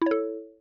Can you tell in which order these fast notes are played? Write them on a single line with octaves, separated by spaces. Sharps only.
E4 C#5 A4